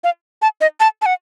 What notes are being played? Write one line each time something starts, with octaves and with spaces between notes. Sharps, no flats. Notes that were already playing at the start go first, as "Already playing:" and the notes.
F5
A5
D#5
A5
A5
F#5